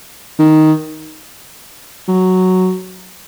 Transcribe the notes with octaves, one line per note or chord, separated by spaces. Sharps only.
D#3
F#3